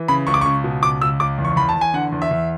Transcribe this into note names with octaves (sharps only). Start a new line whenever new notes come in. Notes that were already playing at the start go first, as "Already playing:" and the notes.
Already playing: E3
C#3 B5
C#2 C#6
D6
C#2 C#6
B2
C#2 D6
C#2 E6
C#2 D6
E2
C#6
E2 B5
A5
E2
G#5
D3 F#5
E2
E5
E2